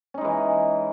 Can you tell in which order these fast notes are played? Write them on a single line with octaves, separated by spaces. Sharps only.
C#4 D#4 G#3 E3